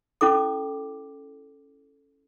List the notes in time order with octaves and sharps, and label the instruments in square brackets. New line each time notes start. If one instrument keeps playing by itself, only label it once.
[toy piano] C#4 E4 A4 D6